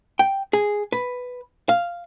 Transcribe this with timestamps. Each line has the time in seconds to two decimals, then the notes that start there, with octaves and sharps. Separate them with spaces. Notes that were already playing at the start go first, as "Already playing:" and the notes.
0.19 G5
0.53 G#4
0.92 B4
1.69 F5